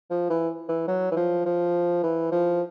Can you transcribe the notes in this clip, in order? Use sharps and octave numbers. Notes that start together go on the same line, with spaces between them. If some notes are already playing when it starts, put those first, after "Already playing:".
F3
E3
E3
F#3
E3
F3
F3
E3
F3